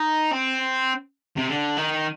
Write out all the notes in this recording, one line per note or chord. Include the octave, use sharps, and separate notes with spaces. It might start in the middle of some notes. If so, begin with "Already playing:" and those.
Already playing: D#4
C4
C3
D3
D#3